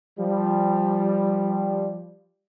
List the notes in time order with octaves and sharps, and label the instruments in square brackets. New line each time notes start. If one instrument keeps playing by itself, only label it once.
[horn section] F3 G3